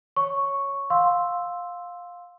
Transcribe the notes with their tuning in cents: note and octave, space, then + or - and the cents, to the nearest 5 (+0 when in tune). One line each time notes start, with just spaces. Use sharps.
C#5 +0 C#6 +0
F5 +15 C6 +0 E6 +0